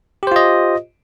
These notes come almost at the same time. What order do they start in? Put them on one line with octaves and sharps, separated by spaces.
G4 C5 F4 D#5